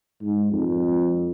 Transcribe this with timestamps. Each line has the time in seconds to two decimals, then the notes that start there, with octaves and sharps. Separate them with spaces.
0.22 G#2
0.52 F2